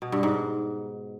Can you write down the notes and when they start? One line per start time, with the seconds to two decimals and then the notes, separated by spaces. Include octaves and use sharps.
0.02 B2
0.12 G2
0.23 G#2